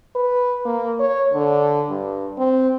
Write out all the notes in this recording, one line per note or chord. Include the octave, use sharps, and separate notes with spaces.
B4
A#3
C#5
D3
G2
C4